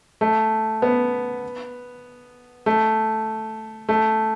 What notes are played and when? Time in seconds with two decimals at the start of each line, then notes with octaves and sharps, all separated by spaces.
0.21 A3
0.82 B3
2.66 A3
3.89 A3